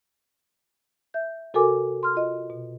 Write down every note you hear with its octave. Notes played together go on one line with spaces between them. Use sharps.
E5 G6
C3 F#4 A4 A#4 G#5 D6
C6 F6
F4 D#5
B2